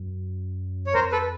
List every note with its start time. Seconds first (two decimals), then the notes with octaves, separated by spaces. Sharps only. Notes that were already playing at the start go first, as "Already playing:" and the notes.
Already playing: F#2
0.86 C#5
0.94 F2 A#4 C5
1.12 A4 B4